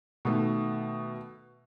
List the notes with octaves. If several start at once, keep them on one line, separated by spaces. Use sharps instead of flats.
B2 D#3 A3